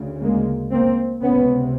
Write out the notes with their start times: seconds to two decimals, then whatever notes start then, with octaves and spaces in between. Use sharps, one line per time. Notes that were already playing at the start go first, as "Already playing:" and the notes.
Already playing: D2 C#3
0.22 G#3 A#3
0.72 A#3 C4
1.22 C#2 C3 B3 C#4